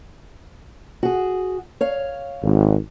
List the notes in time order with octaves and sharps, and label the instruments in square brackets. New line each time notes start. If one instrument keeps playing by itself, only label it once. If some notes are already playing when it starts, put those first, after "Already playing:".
[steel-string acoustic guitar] F#4 G#4
C#5 F5
[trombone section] G#1